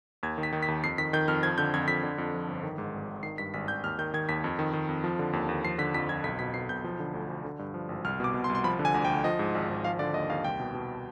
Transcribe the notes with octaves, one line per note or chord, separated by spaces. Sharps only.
D#2 G#6
D#3
B6
D#3
B6
D#2
F2 C7
D#3 B6
D#3 G6
F2 F6
F3 G#6
D3 G6
F2 G#6
F2 B6
D3
F2
F3
G1
D#3
G#2
G#1
G#1
D#3 C7
G2 B6
G#1 B6
G#1 G6
D#2 F6
D#3 G6
D#3 G#6
D#2 B6
F2
D#3
D#3
F2
F3
D3
D#2
D#2
F3 C7
D3 B6
F2 B6
F2 G#6
B1 B6
B2 B6
B2 C7
B1 G6
F3
D3
D2
D2
D3
G2
F3
G#1
C2 F6
B2 D6
B2
C6
C2
C6
F3 B5
D3
G#5
D2
G5
D2
F3 D#5
G#2
G#1
G#1
F3 F5
D3 D5
D#2 D#5
D#2 F5
C2 G5
B2
B2